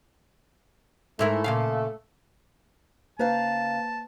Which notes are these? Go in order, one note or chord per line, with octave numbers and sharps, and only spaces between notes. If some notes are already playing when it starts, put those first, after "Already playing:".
G#2 A3 E4 A#4
A#2 C#3 F5
C#3 A#3 B4 C5 F5 A5 A#5